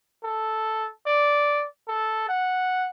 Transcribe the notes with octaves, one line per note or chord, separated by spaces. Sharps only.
A4
D5
A4
F#5